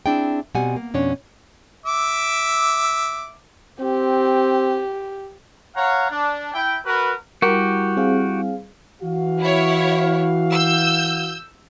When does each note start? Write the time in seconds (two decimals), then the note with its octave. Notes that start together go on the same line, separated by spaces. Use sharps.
0.06 C4 D4 E4 G#4 G5
0.55 B2 G3 C4 G4 F#5 G#5
0.76 A#3
0.94 F2 B2 C#4 D4 C#5
1.86 E5 D6
3.81 C4 G4
5.76 C#5 F5 F#5 A#5
6.10 D4
6.54 E4 G5
6.85 F#4 A#4 B4
7.42 G3 E4 F#4 G4 A#4
7.97 C4 G#4 F5
9.02 E3 F#4 F5
9.40 E4 C#5
10.52 E6 G6